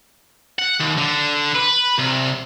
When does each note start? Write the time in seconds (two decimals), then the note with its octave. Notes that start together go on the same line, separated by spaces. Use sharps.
0.59 F#5
0.80 D#2
0.98 D3
1.55 B4
1.98 C2